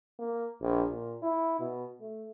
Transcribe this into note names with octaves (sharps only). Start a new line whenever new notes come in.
A#3
A#1
A#2
E4
B2
A3